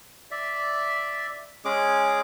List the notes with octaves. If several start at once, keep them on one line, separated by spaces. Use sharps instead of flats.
D5 E5
G#3 C#4 G#4 D6